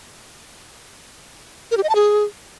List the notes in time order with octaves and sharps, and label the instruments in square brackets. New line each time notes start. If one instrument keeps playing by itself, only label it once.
[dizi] A#4
G4
D#5
A5
G#4